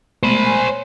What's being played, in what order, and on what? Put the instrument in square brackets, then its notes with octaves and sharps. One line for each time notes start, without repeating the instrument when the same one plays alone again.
[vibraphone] G#3 A3 B3 [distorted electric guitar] C5 B5
[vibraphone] G#5
C#5